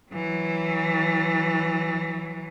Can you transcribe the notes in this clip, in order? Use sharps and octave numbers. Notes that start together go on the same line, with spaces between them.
E3 F#3